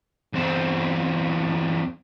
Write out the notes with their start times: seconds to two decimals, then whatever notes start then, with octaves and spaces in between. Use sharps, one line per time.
0.33 E2 C4